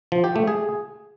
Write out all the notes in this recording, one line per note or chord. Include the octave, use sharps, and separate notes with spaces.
F3
G4
A3
G#4